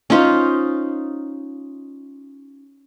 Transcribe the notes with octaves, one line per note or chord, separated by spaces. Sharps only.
C#4 D#4 F4 C5